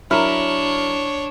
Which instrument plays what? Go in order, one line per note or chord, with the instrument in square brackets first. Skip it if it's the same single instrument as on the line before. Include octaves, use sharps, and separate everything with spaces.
[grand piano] F#3 A#4 F6 [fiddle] D4 [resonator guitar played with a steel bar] E4 [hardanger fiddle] C#5